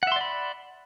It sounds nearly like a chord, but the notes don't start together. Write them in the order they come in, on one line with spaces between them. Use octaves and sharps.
F#5 E5 C6 D5 B5